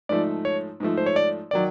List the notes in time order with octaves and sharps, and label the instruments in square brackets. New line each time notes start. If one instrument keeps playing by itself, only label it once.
[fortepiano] G#2 F3 A3 [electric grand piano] D5
[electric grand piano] C#5
[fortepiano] G#2 F3 A3
[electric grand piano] C5
C#5
D5
[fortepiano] D#3 F#3 [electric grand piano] D5